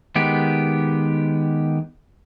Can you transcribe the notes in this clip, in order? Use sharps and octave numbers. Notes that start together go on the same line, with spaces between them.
D#3 G#3 B3 G4